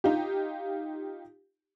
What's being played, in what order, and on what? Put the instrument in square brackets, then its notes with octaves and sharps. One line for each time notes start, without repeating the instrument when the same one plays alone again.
[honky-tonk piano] D#4 F4 G4